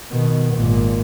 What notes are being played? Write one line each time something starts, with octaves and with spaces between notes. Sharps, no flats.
B2 D#3
G#1 A#2